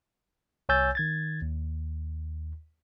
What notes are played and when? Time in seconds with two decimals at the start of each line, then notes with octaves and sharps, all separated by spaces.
0.69 C2 C#5 G#5 E6 G6 A6
0.95 D#3 G#6 A6
1.42 D#2